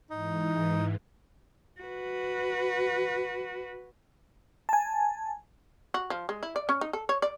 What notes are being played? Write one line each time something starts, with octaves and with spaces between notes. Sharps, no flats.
G#2 E3 D#4
F#4 B4
G#5 A5
F#4
F3
G#3
E4
D5
C#4
D#4
A4
C#5
D5